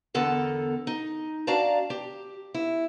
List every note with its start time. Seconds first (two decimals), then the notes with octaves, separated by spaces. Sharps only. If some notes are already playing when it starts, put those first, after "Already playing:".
0.14 E2 D3 B3 A4 A#4
0.87 D#4
1.47 D4 F#4 D5 F5 A5 A#5
1.90 G4
2.54 E4